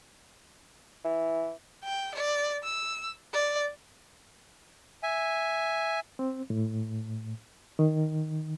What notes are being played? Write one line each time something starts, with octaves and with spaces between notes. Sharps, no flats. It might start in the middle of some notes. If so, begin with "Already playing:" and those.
E3
G5
D5
E6
D5
E5 G#5
C4
A2
D#3